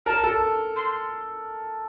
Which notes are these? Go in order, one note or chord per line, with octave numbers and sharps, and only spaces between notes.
A#4 A5
A4
C6